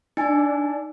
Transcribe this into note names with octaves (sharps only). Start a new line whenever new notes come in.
D4 D#4 G#5